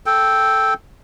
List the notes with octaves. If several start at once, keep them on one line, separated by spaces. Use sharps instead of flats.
A4 G5